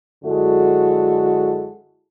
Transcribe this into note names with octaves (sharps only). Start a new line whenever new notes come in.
F#2 D3 G#3 E4 F#4 A4